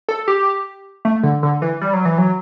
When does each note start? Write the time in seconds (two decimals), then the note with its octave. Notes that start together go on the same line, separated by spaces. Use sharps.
0.09 A4
0.28 G4
1.05 A3
1.23 D3
1.43 D3
1.62 E3
1.81 G3
1.93 F#3
2.05 E3
2.18 F#3